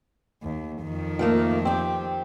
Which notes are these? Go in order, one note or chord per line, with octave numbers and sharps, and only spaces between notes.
D#2
F2 D#3
F3 A3 A#3
C4 G4